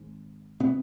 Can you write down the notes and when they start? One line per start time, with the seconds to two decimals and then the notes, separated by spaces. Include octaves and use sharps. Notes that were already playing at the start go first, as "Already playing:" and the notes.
Already playing: G#1 G#2
0.60 C3 B3